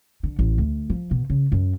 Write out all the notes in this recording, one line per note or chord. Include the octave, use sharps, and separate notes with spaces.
D3
A1
D2
F3
B2
C#3
F#2